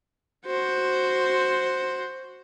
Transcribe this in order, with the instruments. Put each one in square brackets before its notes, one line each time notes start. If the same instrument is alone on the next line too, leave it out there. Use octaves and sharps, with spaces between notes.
[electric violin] F#4 C5